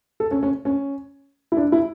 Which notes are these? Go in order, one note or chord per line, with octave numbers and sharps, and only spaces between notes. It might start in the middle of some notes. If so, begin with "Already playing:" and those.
A4
C#4
C#4
C#4
E4
D4
E4